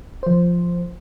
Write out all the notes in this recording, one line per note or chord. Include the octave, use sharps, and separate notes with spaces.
F3 C5